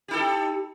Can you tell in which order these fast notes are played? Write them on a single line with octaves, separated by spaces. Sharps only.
G4 D#4 A4